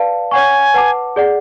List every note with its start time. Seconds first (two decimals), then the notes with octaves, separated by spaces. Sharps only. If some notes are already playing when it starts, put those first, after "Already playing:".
Already playing: B4 D5 F5 A5
0.31 C#5 F#5 G#5 C#6
0.74 B4 F#5 A5 D6
1.16 G#4 D5 F#5